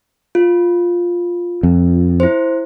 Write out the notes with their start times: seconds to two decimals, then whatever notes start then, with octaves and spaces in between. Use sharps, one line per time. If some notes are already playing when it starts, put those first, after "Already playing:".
0.35 F4
1.63 F2
2.20 E4 C5